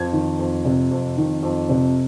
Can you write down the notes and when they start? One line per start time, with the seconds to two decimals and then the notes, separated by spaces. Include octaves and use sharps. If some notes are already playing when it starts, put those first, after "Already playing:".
Already playing: F2 G#6
0.13 D#3
0.39 F2
0.65 C3
0.91 F2
1.17 D#3
1.43 F2
1.69 C3